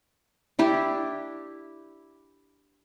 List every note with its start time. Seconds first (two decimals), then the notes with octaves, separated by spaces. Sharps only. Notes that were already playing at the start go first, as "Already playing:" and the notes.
0.59 D4 E4 G4